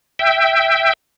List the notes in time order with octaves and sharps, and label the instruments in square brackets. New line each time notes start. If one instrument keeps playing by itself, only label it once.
[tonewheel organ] E5 G5